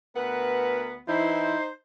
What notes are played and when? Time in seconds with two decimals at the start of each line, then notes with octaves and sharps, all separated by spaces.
0.16 D2 B3 A#4 B4 F#5
1.08 E3 D#4 E4 C5